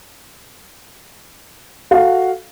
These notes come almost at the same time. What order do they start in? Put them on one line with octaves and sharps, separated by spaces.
F#4 F5 A4